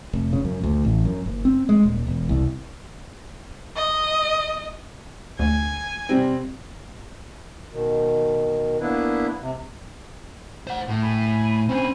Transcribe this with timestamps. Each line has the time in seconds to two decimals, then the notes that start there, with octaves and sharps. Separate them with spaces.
0.13 F1
0.33 C#3
0.45 F#2
0.63 D2
0.85 A1
1.05 F#2
1.26 F#1
1.45 C4
1.69 G#3
1.83 D#1
2.07 E1
2.29 C2
3.76 D#5
5.39 D2 G#5
6.09 C3 G3 C4
7.72 B2 D#3
8.81 A#3 B3 D4 E4 B4
9.40 C3
10.67 C5 F#5
10.88 A2
11.02 G#5 B5
11.69 C4 C#4 C5 G#5 B5